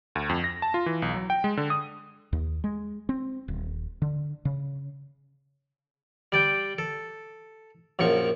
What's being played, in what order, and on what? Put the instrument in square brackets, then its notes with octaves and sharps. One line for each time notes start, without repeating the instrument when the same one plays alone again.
[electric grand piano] D2
F2
A#6
A5
F4
E3
B1
F#3
G5
G#3
D3
D#6
[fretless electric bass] D#2
G#3
C4
D#1
D3
C#3
[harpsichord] G3 D5 G5
A4
A#1 F#2 F3 C#6